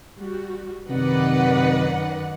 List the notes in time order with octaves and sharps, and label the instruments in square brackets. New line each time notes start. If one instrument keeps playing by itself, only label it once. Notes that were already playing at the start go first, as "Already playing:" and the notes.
[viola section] G3 F#4
[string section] F#2 D#3 F#5 [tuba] C3 [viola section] B4 D5 D#5